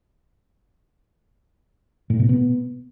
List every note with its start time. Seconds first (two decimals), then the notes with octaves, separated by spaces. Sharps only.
2.10 A2
2.19 B2
2.29 B3